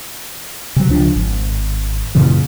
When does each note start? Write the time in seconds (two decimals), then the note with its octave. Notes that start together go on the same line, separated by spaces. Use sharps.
0.76 C3 F#3
0.89 C#2 F3 D4
1.16 G#1
2.15 F#2 A#2 C#3 E3